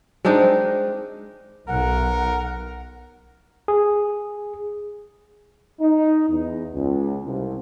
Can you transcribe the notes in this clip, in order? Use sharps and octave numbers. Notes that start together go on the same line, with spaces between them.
G#3 C4 D4 D#4
B1 A#4 F#5
G#4
D#4
E2
C#2
C2